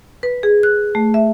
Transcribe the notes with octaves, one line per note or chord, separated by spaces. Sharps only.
B4
G#4
F#6
A3
E5